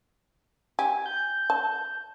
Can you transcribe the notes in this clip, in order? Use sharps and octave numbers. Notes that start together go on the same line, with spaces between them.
G4 G#5
G6
A5